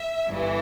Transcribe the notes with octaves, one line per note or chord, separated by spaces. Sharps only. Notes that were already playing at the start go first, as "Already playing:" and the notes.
Already playing: E5
G1 G2 E3